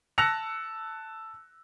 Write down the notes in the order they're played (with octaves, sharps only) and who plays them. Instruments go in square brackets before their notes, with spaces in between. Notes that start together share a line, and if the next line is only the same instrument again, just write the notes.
[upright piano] A5 E6 F#6 A#6 C#7 F7